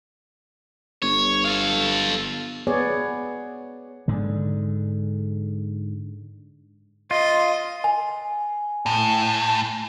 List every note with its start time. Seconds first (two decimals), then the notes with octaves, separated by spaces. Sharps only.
1.02 G1 C#5
1.45 A4 F5
2.67 B3 G#4 C#5 D5
4.08 G#2 D3
7.11 F4 D#5
7.84 G#5
8.86 A2